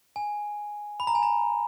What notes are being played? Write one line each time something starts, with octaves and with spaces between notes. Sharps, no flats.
G#5
B5
A#5
G#5
A#5